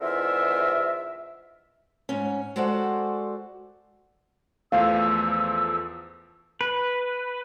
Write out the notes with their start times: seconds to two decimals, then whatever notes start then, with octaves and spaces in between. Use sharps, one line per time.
0.01 E2 G#2 D3 F4 A#4 E5
2.09 G#2 C#4
2.56 G#3 F#4 A4 C5 D5 F#5
4.72 E2 F3 A3 F5 E6
6.61 B4